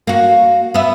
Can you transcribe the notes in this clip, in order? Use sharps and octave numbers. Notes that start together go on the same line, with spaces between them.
A#3 F#4
B3 E5